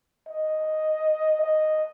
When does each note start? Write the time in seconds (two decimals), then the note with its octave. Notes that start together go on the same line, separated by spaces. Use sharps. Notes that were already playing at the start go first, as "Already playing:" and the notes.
0.29 D#5
1.41 D#5